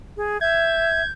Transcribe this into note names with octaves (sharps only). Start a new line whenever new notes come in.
G#4
E5 G6 G#6